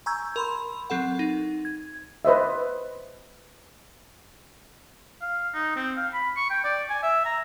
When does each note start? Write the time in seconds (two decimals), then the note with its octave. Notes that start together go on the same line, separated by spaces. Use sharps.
0.06 G#5 A#5 C#6 E6 G6 G#6
0.36 A#4 B5 C6
0.90 F#3 C4 A4 F#5
1.19 D#4
1.65 G#6
2.25 B4 C5 D#5 E5
5.21 F5
5.54 D#4
5.76 C4
5.97 F5
6.13 B5
6.36 C#6
6.50 G5
6.64 D5
6.90 G#5
7.03 E5
7.25 A#5